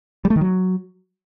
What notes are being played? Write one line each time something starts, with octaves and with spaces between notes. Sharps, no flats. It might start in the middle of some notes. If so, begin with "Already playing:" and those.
G3
A3
D#3
F#3